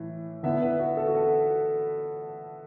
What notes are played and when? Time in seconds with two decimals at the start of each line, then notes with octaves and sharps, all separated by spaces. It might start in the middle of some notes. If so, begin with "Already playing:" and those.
Already playing: A2 E3
0.43 D3 B3 E4 E5
0.62 B4
0.79 F#4
0.97 A4
1.07 F#4
1.15 A4